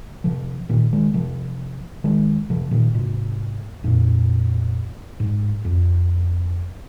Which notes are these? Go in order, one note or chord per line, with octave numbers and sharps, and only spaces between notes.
C3 F3
A#2 D#3
D#3 G#3
C3 F3
D#3 G#3
C3 F3
A#2 D#3
G#2 C3
F2 A#2
G#2
F2